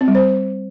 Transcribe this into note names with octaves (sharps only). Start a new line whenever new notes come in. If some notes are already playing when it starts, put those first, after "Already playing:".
C4
G3
C5